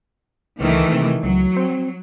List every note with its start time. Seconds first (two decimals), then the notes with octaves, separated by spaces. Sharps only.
0.61 C#2 D#3 E3 A3
0.93 C3
1.24 C#2 F#3
1.57 C4